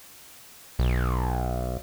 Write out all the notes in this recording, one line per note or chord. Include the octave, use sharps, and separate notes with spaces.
B1